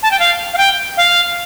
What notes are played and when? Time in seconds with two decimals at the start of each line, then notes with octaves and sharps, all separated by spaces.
0.03 A5
0.11 G5
0.19 F5
0.53 F5
0.58 G5
0.97 F5